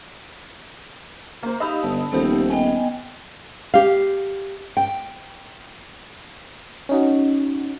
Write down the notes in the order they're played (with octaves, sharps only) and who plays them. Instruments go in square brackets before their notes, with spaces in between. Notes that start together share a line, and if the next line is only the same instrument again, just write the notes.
[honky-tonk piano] A#3 C5
[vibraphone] D#4 G4 F5 [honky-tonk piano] D#5 B5 E6
[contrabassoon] G1 [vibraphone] A5
[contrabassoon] D#1 [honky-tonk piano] F3 C4 A4 [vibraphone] B3 D#4 G4
[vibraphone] B3 D#5 G5 [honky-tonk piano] G#5
[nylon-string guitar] G4 F5
G5
[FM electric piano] C#4 D#4 F#4